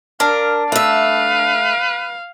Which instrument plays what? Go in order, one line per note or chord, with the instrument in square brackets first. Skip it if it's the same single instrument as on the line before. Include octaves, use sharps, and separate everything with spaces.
[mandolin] D4 [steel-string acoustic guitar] A#4 [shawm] F5
[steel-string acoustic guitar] A3 E5 [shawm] B4 [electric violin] F5